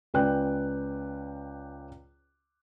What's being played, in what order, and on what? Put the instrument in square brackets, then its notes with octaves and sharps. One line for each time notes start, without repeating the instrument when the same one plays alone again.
[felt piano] C#2 C#4 B4 D5 G5 F#6